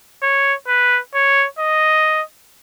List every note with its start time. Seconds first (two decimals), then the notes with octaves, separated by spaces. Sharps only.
0.22 C#5
0.68 B4
1.14 C#5
1.59 D#5